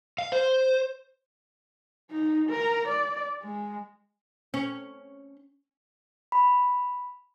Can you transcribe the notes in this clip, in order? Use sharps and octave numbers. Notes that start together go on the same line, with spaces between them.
F5
C5
D#4
A#4
D5
G#3
C#4
B5